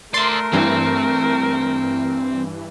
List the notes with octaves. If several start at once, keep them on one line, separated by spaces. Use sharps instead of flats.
A3 A#4 D5 E5 C6
G2 E3 C4